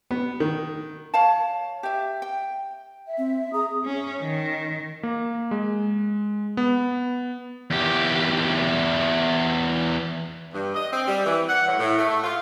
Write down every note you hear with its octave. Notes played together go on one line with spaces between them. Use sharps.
B3
D#3
C#5 F5 A5
G4 E5
G5
E5
C4
G#4 A#5 D#6
C#4
D#3
A#3
G#3
B3
E2 G4
G2
D#5
C4
G3
E3
F#5
A2
A2
A3
F4